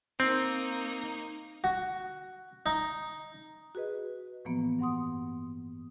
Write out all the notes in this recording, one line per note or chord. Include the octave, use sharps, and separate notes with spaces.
A#3 C4 D#4
F#4
D#4
F#4 G#4 B4 D#5
A2 E3 F3 A#3 B3
G2 F#5 C6 D#6